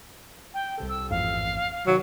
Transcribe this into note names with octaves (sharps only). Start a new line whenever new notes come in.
G5
C2 C3 A4
E6
A1 F2 G#2 F5
C3 D#3 F#3